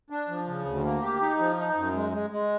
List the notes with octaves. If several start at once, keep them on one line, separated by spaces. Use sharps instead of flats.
D4
F3
C#3
D2
A#3
G4
D#4
F3
D#4
F#2
G#3
G#3
G#3